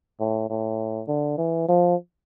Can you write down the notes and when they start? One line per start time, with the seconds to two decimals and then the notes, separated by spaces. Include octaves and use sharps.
0.20 A2
0.50 A2
1.08 D3
1.38 E3
1.68 F3